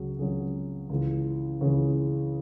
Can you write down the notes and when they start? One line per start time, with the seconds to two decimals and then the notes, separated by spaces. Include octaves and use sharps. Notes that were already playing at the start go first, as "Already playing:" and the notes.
Already playing: C#2 C#3 F#3 F#4 G#4
0.18 C#2 C#3 F#3 G#4
0.90 C#2 C#3 E3
1.61 C#2 C#3 E3 G#4 C#5